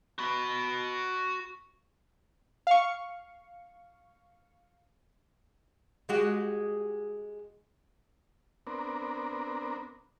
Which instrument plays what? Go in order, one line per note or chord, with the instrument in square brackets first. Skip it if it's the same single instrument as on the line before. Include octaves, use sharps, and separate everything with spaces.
[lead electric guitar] F#4 B5
[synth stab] F5 C#6
[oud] G#3 F#4 G4
[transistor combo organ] B3 C4 D4 A#4